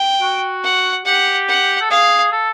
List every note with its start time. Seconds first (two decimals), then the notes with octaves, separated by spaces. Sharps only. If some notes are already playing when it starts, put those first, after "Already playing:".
Already playing: G5
0.21 F#4
0.64 F#5
1.06 G4 F#5
1.48 F#5
1.81 A4
1.91 G#4 F5
2.32 A4